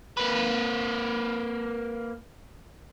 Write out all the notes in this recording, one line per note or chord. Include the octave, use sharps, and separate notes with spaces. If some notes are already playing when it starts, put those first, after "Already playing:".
A#3 B4